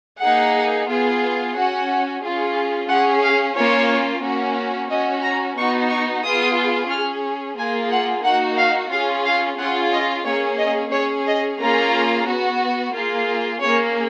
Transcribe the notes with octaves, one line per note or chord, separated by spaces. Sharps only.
A#3 D#4 G#4 F#5
B3 F4 G#4
C#4 F#4 F#5
C#4 F4 G#4
C#4 G#4 F#5
F5
A#3 C#4 F4 C#5
A#3 C#4 F#4
C#4 F#4 D#5
A#5
B3 D#4 F#4 C#6
C#6
B3 F4 G#4 D#6
C#4 G#4 F6
A#3 F4 G#4 G#5
F#5
A#3 D#4 F#4 F#5
F5
C#4 F4 G#4 F5
F5
C#4 F4 G#4 F#5
D#5
A#3 C#4 G#4 C#5
D#5
C#4 G#4 C#5
D#5
A#3 C#4 F4 G#4 A#5
B3 F#4
A#3 F4 G#4
A#3 C#4 G#4 C#5